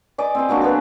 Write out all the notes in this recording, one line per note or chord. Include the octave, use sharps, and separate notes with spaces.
G#4 D5 D#5
C4 C6
F#3 A#3 D4 F#4
B3 G#4